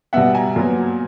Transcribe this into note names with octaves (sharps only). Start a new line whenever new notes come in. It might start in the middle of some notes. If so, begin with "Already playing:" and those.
B2 G3 B3 E5 F#5
G#5 A#5
A#2 F#3 B3